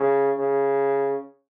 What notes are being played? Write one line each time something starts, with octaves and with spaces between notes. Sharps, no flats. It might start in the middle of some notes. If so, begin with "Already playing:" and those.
Already playing: C#3
C#3